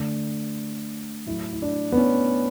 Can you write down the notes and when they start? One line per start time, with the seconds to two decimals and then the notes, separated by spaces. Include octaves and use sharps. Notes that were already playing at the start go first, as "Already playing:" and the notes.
Already playing: D3 A3
1.26 A2 F#3 A3 E4
1.53 E4
1.62 D4
1.92 B3
1.97 C#4